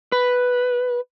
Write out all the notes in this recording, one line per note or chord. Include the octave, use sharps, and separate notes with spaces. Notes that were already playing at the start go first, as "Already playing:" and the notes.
B4